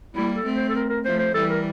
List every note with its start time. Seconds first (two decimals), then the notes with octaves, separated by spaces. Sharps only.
0.15 G3 A#3 E4
0.35 A4
0.45 A3 C4
0.55 C5
0.69 A4
0.75 A#4
0.90 A#4
1.05 F3 A3 C5
1.19 C5
1.34 E3 G3 A4
1.50 A#4